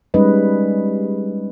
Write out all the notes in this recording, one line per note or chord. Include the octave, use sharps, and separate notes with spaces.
G3 G#3 C#4 D#4 B4 D#5